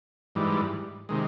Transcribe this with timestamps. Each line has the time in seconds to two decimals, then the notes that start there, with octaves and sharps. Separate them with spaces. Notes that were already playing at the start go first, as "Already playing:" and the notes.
0.35 G#2 E3 G3
1.09 C3 D#3 G#3